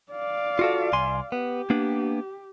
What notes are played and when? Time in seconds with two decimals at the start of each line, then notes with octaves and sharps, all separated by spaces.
0.12 D5 F5
0.59 F4 F#4 A4
0.93 C2 G#5 C6
1.32 B3 G4
1.70 A#3 B3 D4